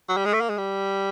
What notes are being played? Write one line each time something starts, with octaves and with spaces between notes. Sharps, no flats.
F#3
G3
G#3
A3
A#3
G#3
G3